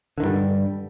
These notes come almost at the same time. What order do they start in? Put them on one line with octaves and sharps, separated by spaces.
D3 D#3 G2 G3